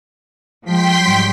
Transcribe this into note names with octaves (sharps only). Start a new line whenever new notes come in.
F3 G#3 G5 C6 B6
G#2 F#3 G3